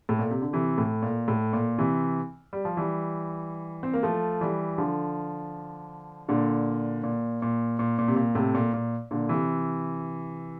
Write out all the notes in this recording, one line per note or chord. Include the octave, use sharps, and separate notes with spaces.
A2
A#2
C3
D3
C3 E3
A2
A#2
A2
A#2
C3 E3
G3
F3
E3 G3
C4
A#3
F3 A3
E3 G3
D3 F3
A#2 D3
A#2
A#2
A#2
A#2
C3
A#2
A2 C3
A#2
A#2
A#2 D3
C3 E3